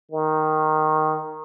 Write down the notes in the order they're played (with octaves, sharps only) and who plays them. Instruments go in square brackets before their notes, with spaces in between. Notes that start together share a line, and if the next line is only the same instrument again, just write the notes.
[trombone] D#3